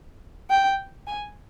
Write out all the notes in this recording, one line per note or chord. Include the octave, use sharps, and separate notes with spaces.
G5
G#5